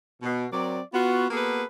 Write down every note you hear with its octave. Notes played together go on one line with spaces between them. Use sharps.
B2
F#3 C4 A#4 D5
B3 F4 F#4
A#3 B3 F#4 G#4 A4 B4